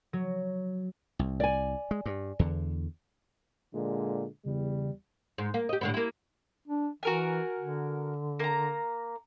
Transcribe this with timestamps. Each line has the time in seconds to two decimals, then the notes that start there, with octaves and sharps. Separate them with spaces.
0.13 F#3
1.19 C2
1.40 D5 G#5
1.91 G#3
2.06 G2
2.39 E2 D3
3.75 A#2 D3 G#3
4.46 E2 C#3 G3
5.38 G#2
5.54 A#3
5.69 G4 D#5
5.81 A2 D3 B3
5.94 A#3 E4
6.68 D4
7.03 E3 F#4 A#4 G#5
7.59 D3
8.40 A#3 A#5